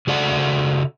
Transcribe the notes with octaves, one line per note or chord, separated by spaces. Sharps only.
C#3 F#4 A4 D5 F#5 A5